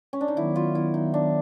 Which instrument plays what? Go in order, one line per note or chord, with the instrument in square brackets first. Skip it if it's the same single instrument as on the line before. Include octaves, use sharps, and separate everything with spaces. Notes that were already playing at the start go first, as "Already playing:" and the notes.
[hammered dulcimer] C#4
D4
D#4
[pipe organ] D#3 F#3 B3 [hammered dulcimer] E4
[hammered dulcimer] F4
E4
D#4
D4